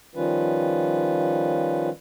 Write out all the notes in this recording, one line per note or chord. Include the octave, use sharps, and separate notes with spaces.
D#3 F3 G3 C#4 F4 B4